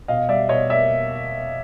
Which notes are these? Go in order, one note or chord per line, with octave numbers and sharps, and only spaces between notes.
B2 D#5 F5
G3 D5 E5
B2 C#5 D#5
A#3 D5 E5